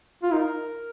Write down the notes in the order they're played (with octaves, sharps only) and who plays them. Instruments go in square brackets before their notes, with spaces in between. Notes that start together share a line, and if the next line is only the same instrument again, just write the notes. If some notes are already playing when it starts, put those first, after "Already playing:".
[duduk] F4
[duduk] D#4 [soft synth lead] A#4